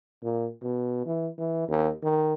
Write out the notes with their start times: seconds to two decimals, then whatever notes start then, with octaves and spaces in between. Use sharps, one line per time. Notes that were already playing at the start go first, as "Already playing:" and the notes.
0.23 A#2
0.62 B2
1.06 E3
1.38 E3
1.68 D#2
2.03 D#3